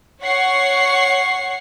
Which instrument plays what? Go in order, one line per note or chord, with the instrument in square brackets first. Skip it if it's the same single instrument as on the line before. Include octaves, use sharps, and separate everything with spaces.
[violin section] C#5 F#5 C#6 C7